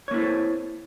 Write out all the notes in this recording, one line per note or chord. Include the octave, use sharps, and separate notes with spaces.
A#3 C4 E4 A4 C#5